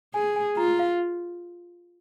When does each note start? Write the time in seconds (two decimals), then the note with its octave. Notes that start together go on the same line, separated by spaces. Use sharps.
0.14 G#4 G#5
0.36 G#5
0.57 F4 A#5
0.79 F5